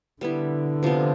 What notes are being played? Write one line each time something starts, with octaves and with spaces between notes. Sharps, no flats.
D3 G3 B3 E4
C3 F3 B3